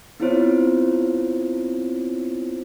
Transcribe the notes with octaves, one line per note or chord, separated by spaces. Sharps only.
B3 C4 E4 F4 C5 C#5